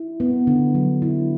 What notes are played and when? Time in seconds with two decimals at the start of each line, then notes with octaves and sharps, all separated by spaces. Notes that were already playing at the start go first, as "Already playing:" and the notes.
Already playing: E4
0.20 B3
0.47 D3
0.75 F#3
1.02 E4